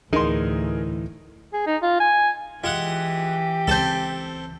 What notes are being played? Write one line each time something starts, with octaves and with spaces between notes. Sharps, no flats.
D2 A2 E3 D#4 G#4 A#4 C6
G#4
D#4
F4
G#5
E3 G#3 F4 G4 F#5
C#2 C4 A4 A5 G6